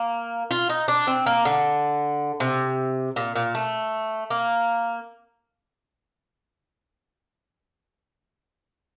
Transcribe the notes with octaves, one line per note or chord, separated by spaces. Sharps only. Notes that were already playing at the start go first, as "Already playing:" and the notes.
Already playing: A#3
F4
D#4
D4
C4
A#3
D3
C3
A#2
A#2
A3
A#3